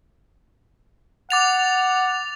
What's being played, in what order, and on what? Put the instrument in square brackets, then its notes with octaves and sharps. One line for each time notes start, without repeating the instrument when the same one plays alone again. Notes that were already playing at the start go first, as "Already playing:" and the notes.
[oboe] F#5 [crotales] D6 A6 F7